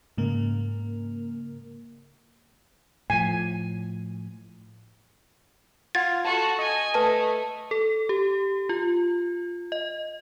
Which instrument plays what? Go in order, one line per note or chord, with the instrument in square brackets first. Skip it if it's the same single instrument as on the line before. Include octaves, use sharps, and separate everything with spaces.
[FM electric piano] G#2 C#3 A#3 A#4
[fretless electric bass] A2 F3 [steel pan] G#5
[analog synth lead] F4 [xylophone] F#5 G#6 A6
[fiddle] F#4 A4 [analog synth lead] A5
[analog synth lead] D#5 [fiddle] G#5
[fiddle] A3 [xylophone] B4 A5
[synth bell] A4
G4
F4
D#5